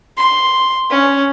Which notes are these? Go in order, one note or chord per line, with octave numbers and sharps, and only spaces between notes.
C6
C#4